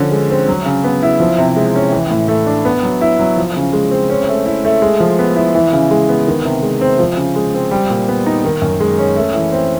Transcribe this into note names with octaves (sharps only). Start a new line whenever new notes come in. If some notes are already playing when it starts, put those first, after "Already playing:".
Already playing: D3 F3 C#4
G#3
C4
F#3
C#3
B3
E4
F3
C3
G#3
C#4
E3
A2
A3
D4
B3
F#3
E4
F#3
F3
C#3
G#3
C4
C#4
A3
E4
A3
G#3
F3
B3
E4
E3
C#3
G#3
B3
D#3
C3
G#3
C4
F3
C#3
G#3
C4
G3
A#2
B3
D#4
D#3
F#2
G#3
C#4
A3
E3
C4